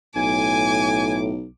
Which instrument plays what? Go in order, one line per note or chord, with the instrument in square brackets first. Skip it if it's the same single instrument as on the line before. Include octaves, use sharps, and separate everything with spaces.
[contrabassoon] B1 [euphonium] A2 [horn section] G#5 [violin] D6